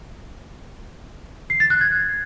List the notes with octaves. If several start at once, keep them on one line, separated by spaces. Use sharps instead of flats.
C7
A6
F#6
G#6